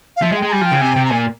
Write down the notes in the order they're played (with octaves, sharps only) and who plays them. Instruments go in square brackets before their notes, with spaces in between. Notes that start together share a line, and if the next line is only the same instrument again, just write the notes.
[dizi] F5
[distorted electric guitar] F3 [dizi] E5
[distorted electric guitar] G#3
[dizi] G5
[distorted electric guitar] G#3
[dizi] A#5
[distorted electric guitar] G3 [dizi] G#5
[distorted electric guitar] F3
[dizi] G5
[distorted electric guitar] C#3
[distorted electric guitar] C3 [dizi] G#5
[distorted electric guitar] C3 [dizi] G5
[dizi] A#5
[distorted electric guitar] A#2 [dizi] G#5